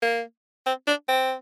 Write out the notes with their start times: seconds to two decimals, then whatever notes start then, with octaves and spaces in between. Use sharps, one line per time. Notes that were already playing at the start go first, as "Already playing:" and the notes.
0.02 A#3
0.66 C4
0.87 D4
1.08 C4